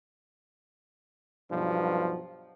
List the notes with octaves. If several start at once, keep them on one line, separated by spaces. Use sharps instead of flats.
B1 G2 B2 F3